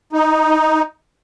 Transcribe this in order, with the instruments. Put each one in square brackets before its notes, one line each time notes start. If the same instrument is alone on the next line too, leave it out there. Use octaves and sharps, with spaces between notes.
[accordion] D#4